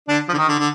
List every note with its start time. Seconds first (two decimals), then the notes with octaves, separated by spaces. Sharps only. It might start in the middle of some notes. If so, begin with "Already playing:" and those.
0.08 D3 D4
0.28 F3
0.33 D3
0.38 D#3
0.48 D3
0.58 D3